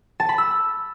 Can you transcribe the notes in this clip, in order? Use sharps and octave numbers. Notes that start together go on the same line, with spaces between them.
A5
B5
E6